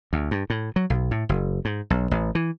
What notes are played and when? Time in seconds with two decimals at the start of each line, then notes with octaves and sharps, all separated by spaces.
0.13 D2
0.31 G2
0.50 A2
0.76 F#3
0.90 B1
1.11 A2
1.29 F#1
1.65 G#2
1.90 B1
2.11 A1
2.35 E3